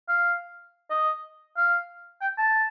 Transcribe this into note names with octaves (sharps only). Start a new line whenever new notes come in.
F5
D#5
F5
G5
A5